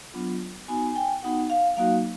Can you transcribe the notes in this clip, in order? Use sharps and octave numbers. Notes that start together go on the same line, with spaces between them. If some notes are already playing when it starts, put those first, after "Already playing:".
F#3 B3 D4 F4
B3 D#4 F#4 G#5
G#5
G5
B3 D#4 F#4 F#5
F5
F#3 A#3 D#4 F#4 F5